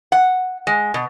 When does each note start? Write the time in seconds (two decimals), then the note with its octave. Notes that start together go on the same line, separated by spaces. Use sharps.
0.12 F#5
0.67 G#3
0.94 B2